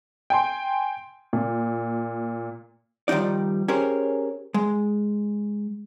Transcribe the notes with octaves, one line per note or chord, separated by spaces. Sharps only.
G5 G#5 C6
A#2
D#3 F3 G3 D#4 D5
C#4 G4 G#4 A#4 C5 C#5
G#3